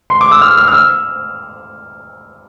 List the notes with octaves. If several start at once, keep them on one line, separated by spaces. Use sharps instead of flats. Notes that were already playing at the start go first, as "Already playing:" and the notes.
C6
D6
E6
F6
F6
F6
E6